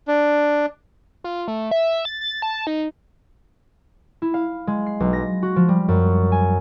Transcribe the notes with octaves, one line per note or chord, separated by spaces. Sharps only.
D4
F4
A3
E5
A6
A6
A5
D#4
E4
F5
G#3
C7
B1
A#6
F#4
F3
G3
F#2
G#5